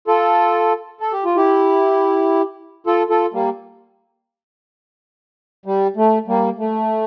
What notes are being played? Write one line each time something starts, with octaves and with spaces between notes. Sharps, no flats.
F4 A4
A4
G4
F4
E4 G4
F4 A4
F4 A4
G3 A#3
G3
A3
G3 A#3
A3